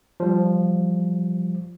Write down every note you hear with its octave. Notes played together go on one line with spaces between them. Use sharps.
F3 G3